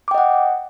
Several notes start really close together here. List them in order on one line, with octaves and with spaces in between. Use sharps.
D6 G5 D#5 F#5